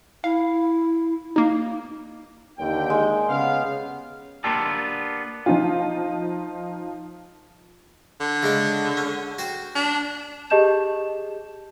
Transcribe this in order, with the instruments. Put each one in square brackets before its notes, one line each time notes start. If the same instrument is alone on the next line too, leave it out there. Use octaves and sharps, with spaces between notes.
[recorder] E4 [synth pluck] F5
[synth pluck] A#3 D#4
[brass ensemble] D#2 D3 G5
[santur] G#3
[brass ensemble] C#3 B3 F5
[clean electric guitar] A#3 B3 D4 F4 G4 A4
[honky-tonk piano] F3 D#4 F4
[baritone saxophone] D3
[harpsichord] C#3 G#3 D4
C#4
F#4 C5 G5
[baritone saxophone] D4
[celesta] G4 G#4 D#5 A5 G6 E7